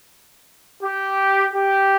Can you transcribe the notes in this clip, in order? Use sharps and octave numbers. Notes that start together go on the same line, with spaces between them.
G4
G4